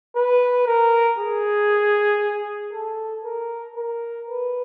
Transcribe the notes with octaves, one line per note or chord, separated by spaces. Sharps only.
B4
A#4
G#4
A4
A#4
A#4
B4